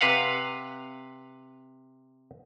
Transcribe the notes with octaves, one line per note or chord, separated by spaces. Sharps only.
C3 B4 F5 F#5